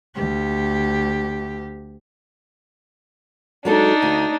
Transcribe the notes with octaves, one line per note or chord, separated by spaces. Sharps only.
D2 G4
F#3 G#3 D4 D#4 A4
D2